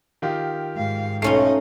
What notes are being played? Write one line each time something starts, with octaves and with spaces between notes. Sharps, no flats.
D#3 F4 G4
G#2 F5
B1 A3 C#4 D#4 F4 C7